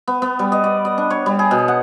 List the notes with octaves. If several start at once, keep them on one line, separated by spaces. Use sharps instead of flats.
B3
B3
G3
D#5
D5
D#5
D4
C#5
G3
G#4
B2
F#5